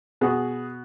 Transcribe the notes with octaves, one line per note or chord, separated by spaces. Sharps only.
B2 B3 F#4 G#4